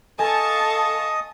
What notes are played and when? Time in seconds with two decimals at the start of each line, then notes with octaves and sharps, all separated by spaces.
0.19 A4 D#5 F5 G#5 A5 C#6 D#6